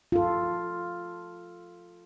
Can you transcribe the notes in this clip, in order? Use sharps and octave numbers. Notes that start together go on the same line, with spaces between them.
F4 A4